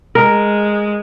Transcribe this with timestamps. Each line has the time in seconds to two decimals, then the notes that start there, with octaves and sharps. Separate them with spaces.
0.15 G#3 A#4